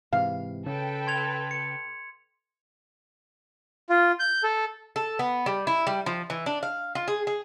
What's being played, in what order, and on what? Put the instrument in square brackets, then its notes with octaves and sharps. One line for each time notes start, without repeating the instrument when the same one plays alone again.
[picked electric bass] G#2 C3 E3 [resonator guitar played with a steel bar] F5
[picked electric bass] C#3 [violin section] A4 B4 G5
[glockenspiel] C6 G#6 F7
C#7
[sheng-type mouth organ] F4
G6
A4
[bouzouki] A4
B3
G3
E4
G3
F3
E3
D4
F5
F4
G#4
G#4